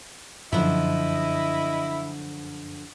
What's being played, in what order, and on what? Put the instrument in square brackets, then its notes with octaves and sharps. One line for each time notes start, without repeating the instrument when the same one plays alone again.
[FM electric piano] F#2 [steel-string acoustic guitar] D3 F3 [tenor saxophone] E4 [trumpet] D#5